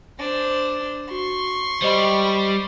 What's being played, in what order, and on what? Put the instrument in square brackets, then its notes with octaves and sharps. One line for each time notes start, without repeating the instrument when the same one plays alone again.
[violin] D4 C5
[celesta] F#4 [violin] C6 C#6
[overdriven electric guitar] G3 [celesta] C5 D#5 B5